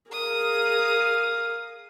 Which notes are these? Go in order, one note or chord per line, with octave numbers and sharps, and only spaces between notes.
G#4 A#4 F5 D#6